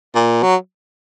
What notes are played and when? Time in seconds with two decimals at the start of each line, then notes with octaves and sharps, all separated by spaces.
0.15 A#2
0.43 F#3